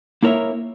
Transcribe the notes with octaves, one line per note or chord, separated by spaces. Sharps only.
A#3 E4 A#4 C#5 E5